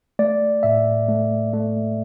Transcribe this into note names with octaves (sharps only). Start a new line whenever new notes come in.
A3 D5
A2 E5
A3
A3